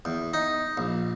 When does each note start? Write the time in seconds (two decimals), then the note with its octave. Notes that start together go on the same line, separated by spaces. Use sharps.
0.05 E2
0.34 D#4
0.77 A#1